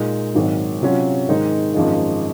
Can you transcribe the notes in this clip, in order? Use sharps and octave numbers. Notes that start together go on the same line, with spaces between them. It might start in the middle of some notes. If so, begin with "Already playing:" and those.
Already playing: A#2 G#3 D#4
G#1 G#2 D#3 F#3
C3 F#3 C#4 F4
G#2 D#3 G#3 D#4
G#1 F#2 F3 G#3 D#4